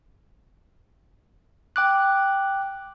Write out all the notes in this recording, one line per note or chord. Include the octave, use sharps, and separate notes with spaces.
G5 D6 F#6